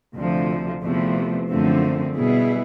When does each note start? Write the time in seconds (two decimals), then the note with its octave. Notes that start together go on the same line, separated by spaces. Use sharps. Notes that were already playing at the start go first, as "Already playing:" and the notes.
0.15 D2 C3 F3
0.82 E2 C3 F3 A3
1.49 F#2 D3 F3 A3 C4
2.15 B2 G3 B3 E4 G#4